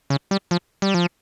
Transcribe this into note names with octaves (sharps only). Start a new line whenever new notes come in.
C#3
G3
F3
G3
F3